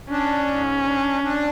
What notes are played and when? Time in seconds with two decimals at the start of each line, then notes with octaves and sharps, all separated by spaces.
0.10 C#4 D4
0.47 G#2
0.86 D4
1.23 D4